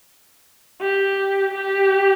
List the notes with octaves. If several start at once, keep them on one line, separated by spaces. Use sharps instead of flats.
G4
G4